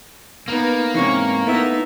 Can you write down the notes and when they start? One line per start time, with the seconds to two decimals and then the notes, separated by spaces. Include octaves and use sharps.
0.48 A#3 B3 D#4
0.94 G#2 C3 E3 C#4 C#6
1.47 A3 B3 D#4 E4 E5